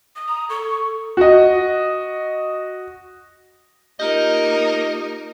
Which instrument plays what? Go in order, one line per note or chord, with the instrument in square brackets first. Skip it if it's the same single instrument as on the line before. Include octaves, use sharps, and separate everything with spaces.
[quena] D#6
[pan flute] A#5
[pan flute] A4 [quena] C#6
[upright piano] F#4 D#5
[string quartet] A#3 D#4 A#4 [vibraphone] F4 G4 [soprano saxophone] D#5